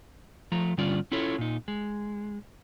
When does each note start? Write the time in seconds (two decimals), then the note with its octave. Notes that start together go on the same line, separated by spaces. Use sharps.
0.52 F3 A3 A#5
0.78 G2 D3 G3 C#4 F4 D5
1.12 C#4 E4 F4 A4 C#5
1.38 A#2 D#4
1.68 G#3